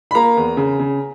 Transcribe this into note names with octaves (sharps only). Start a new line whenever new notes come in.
B5
A#3 A#5
E2
C#3
C#3